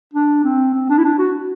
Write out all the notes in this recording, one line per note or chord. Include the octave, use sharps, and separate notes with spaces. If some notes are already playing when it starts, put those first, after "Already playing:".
D4
C4
C4
D4
E4
D4
F#4